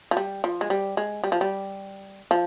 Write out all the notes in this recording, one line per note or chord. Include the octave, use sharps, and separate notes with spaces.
F3
G3
F3
G#3
G3
G#3
G3
F3
G3
F3